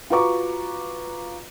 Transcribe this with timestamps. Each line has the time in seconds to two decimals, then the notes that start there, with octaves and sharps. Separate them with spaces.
0.10 F4 F#4 B4 A#5 C#6 D6